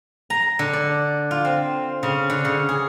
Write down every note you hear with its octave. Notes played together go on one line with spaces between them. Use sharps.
A#5
D3
D5
F4
C4
C#3
D3
C#3
G#4